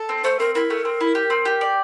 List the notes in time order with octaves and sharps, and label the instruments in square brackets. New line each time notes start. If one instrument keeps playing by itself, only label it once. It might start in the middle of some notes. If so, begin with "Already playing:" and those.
Already playing: [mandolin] A4
C4
[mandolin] A3 [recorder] C5
[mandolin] C4 [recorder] A#4
[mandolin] E4 [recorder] A#4
[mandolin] A3
C4
E4
G4
C4
G4
D5